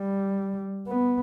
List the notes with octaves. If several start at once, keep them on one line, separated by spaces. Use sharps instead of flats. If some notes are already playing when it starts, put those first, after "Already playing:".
Already playing: G3
B3